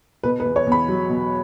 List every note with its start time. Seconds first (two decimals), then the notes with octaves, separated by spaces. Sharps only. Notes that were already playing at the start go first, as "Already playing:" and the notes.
0.23 B2 B4
0.40 B4
0.45 E2
0.56 C#5
0.66 E2
0.72 B5
0.88 F#3
1.09 B2